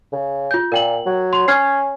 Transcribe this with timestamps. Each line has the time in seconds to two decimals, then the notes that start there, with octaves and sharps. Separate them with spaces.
0.12 C#3
0.51 F4 G6
0.72 A#2 A#4 G5 F#7
1.06 F#3
1.33 C6
1.48 C#4 F6 G#6 C7